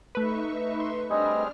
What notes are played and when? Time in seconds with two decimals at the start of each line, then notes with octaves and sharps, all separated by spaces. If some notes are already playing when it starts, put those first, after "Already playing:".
0.15 A3 D#4 B4 E5 C#6
0.80 C6
1.10 G3 C4 D4 G#4 D#5 F6